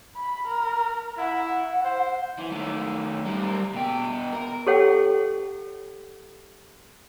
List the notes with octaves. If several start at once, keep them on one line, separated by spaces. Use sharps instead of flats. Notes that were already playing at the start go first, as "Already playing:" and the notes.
B5
A#4
E4 F#5
C5
E3
D#3 A3
G3 A#4
B2 G5
A#4
G4 A4 C#5 F#5 G5